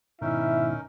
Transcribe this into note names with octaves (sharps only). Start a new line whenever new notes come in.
G#2 B2 D#3 C#4 D#4 E4 A#4 E5